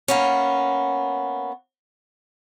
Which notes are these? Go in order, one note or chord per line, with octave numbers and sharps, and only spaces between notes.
A#3 B3 C#4